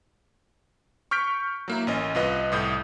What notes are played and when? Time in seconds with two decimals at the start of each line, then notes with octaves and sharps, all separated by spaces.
1.11 C#6 F6 G6 B6 D7
1.68 F#3 A#3 E4
1.87 A1 C#4 D#5
2.15 C2 F4 B4 D#5
2.52 C2 A2 D#6 G6